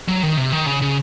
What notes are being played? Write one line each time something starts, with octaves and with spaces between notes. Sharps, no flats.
F#3
D#3
C3
D#3
C#3
C#3